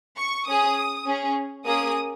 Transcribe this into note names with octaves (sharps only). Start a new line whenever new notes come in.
C#6
C#4 G#4 D#6
C#4 G#4
A#3 C#4 G#4 D#6